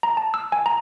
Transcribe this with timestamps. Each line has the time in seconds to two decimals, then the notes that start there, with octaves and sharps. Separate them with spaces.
0.03 A#5
0.17 A5
0.34 E6
0.52 G#5
0.66 A#5